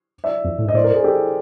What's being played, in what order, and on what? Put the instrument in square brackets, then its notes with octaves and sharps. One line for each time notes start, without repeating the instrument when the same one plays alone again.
[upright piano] D5 E5
[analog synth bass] F2
A2
G#2
[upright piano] D#5
[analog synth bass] A2 [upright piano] C5 D5
[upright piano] A#4 C5
G#4 A#4
G4 A4